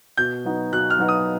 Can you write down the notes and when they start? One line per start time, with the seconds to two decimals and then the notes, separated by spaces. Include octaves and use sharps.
0.17 B2 G6
0.45 F#3 B3 D#4 F#4
0.72 B2 F#6
0.90 F6
0.99 F#3 B3 D#4 F#4
1.09 D#6